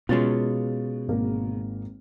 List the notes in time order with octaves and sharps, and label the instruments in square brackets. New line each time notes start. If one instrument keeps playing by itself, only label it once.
[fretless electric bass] B2 [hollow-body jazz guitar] G#3 C#4 F4 [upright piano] A6
[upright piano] G#1 A#3 A#4